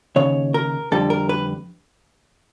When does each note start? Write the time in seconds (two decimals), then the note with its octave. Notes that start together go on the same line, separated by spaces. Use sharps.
0.16 D#2 C#3 C#5
0.54 A#4
0.92 F2 D3 G3 A4
1.10 A#4
1.29 B4